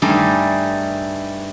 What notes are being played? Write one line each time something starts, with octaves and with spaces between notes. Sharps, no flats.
G2 G3 A3 D#4 G#4